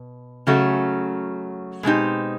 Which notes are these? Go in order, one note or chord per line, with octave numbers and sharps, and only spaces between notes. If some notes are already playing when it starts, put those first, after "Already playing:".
Already playing: B2
C#3 F#3 A3 C#4 F#4
B2 G#3 C4 D#4 G4